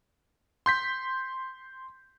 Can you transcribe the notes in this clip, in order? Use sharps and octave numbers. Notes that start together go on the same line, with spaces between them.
C6 G6 B6